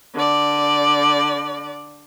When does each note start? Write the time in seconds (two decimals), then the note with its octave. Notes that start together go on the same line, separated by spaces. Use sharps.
0.15 D3 D5